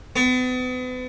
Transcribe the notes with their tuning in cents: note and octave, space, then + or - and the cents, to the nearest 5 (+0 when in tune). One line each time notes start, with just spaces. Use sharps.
B3 +40